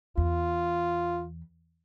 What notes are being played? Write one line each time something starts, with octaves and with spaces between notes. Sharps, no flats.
E2 F4